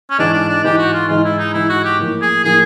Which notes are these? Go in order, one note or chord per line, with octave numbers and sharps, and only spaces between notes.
C#4
G#2 E3 G#3 D4
D4
D4
G#2 E3 G#3 G4
F#4
F4
G#2 E3 G#3 F4
E4
D#4
G#2 E3 G#3 E4
F#4
G4
A2 F3 A#3
G#4
A2 F3 A#3 G#4